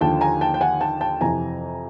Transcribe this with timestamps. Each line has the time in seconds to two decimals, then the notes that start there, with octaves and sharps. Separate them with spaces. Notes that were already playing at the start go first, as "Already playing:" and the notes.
0.01 D#2 D3 F3 G5 A5
0.21 G#5 A#5
0.41 G5 A5
0.54 G5
0.61 F#5 G#5
0.81 G5 A5
1.01 G5 A5
1.21 F2 C3 E3 G#5 A#5